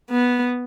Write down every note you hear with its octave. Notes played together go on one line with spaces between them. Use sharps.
B3